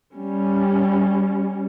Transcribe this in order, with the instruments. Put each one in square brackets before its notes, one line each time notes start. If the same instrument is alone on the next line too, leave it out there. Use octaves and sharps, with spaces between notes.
[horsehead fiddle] G3 C#4